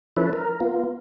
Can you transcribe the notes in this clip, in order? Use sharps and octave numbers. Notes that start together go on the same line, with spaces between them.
F3 C#4 E4 A4 B4
A#4
B3 F4